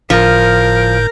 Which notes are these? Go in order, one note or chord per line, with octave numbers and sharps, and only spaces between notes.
G1 A2 F3 A#4 G6